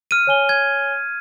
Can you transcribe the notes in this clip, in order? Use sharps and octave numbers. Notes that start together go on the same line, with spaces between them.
F6 D#7
C#5 G#5 G7
G#6